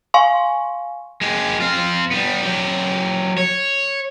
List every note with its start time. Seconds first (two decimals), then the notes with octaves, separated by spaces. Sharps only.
0.14 F5 G#5 C6 C#6
1.21 G#3 G4
1.60 C4 F4
2.11 G3 B3
2.42 F#3 G4
3.37 C#5